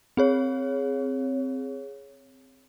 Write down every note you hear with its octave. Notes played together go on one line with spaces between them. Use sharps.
C4 G#4 C#5